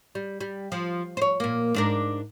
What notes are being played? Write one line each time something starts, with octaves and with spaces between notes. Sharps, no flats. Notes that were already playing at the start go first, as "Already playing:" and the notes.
G3
G3
F3
C5 C#5
A#2 A#3
G#2 D4 A#4